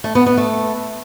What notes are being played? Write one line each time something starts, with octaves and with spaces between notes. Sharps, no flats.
A3
B3
B3
A3